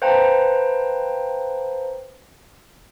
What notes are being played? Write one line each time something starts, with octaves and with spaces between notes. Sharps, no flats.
B4 C5 F5 G5 A5 A#5